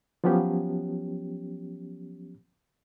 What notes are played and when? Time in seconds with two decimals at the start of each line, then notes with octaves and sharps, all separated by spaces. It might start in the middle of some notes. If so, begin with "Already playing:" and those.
0.24 F3 F#3 B3 C#4 G4